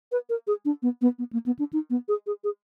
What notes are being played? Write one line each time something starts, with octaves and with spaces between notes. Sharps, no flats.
B4
A#4
G#4
D4
B3
B3
B3
A#3
B3
D4
D#4
B3
G#4
G#4
G#4